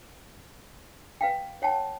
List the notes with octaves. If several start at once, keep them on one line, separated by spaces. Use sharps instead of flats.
B4 F5 G5
C#5 F#5 G5 A5